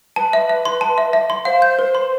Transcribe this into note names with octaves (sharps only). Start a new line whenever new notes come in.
B4 A5
E5
E5
C6
A5
E5
E5
C6
C5 F5
G6
B4
C6